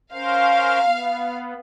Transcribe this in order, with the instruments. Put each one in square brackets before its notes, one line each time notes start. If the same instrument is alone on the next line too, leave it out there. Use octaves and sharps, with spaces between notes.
[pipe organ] C#4 A#4 C5 [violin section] F5
[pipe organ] B3